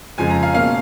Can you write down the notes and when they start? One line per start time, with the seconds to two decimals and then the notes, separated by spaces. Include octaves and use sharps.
0.18 F2 C#3 F3 G#3 G#5
0.30 A#5
0.43 F5
0.54 B2 A#3 C#4 F5